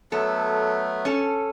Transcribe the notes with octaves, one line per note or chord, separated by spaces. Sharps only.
F#3 A3 B3 A4
C#4 A4